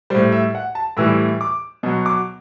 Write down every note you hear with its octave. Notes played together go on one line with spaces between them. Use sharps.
A2 G3 C5
E5
F#5
A5
A2 E3 G3 E6
D6
B2 F#3
D6